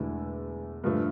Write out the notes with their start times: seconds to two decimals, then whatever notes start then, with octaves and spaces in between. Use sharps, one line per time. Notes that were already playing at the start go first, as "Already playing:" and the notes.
Already playing: E1 E2 D3 A3 E4
0.84 G2 D3 F3 A3